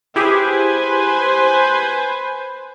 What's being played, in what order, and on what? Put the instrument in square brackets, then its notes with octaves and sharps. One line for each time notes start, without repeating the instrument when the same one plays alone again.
[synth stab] E4 G4 G#4 [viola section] B4 C5 G#5